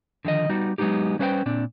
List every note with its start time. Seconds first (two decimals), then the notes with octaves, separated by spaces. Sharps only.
0.25 D3 D#3 F3 D#5
0.49 G3 B3 D#4 F#4
0.78 F#3 G#3 B3 D4 D#4 G4
1.19 G3 C#4 B4 C5 F5 G5
1.46 A#2 C4 D4